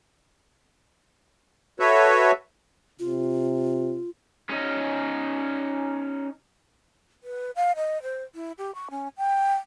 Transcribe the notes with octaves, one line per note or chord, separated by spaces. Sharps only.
F#4 A4 B4 C#5 E5
C3 F4
C#4 D#4
B4
F5
D#5
C5
E4
G4
C#6
C#4
G5